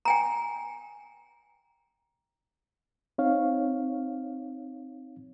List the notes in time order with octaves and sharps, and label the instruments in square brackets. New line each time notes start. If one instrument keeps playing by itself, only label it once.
[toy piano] G5 G#5 A#5
[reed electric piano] C4 D#4 C#5 F5